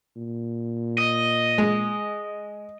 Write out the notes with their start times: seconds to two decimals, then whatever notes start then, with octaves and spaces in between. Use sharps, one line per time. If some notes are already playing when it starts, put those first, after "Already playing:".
0.16 A#2
0.98 D#5
1.58 G#3